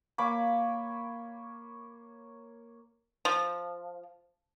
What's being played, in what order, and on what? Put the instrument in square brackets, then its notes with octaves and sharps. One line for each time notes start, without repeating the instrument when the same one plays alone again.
[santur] A#3 C#5 B5 D6
[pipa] F3